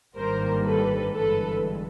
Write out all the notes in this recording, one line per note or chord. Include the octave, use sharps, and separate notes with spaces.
G#1 G2 D#3 G3 A#3 A#4 C5
A4 B4
G1 G2 E3 G#3 A4 B4